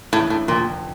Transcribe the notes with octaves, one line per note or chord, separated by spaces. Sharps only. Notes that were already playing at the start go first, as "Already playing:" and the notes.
C#2 A2 C#3 E3 A3 D4
A2
F1 F2 A#2 D3 F3